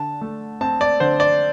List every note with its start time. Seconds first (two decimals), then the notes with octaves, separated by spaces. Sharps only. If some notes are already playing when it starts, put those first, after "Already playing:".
Already playing: D3 A5
0.21 A3
0.61 C4 A5
0.81 D5
1.00 D3 C5
1.20 D5